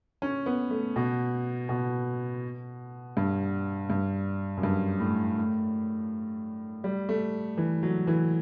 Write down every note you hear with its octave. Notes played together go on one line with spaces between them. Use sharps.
C#4
B3
A3
B2
B2
G2
G2
F#2
G2
A2
A2
G3
A3
E3
F#3
E3